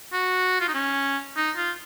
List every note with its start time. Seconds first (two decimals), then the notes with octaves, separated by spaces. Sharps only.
0.13 F#4
0.61 F4
0.68 D#4
0.74 C#4
1.37 D#4
1.57 F4